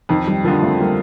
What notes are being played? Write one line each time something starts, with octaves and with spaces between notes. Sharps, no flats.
F2 D#3
D#3 G3
D3 F3 G3 A#3
A3 C4
G3 A#3